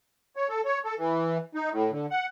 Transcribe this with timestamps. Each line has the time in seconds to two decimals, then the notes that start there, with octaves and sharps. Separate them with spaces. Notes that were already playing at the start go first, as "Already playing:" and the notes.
0.36 C#5
0.49 A4
0.65 C#5
0.85 A4
0.98 E3
1.55 D#4
1.72 A2
1.91 D3
2.11 F#5